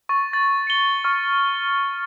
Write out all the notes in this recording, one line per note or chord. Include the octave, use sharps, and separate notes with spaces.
C#6 A6
A6
C#7 G7
C#6 F6